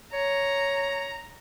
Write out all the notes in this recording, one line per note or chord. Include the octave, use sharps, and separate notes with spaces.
C#5 A#5